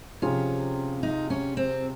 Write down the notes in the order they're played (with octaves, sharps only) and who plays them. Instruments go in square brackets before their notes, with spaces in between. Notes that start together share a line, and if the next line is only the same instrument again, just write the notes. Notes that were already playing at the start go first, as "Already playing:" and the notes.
[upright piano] C3 F3 C4 F4 G#4 [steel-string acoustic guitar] C#4
[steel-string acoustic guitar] D#4
C#4
C4